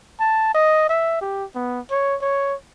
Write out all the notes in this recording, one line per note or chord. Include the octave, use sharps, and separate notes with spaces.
A5
D#5
E5
G4
B3
C#5
C#5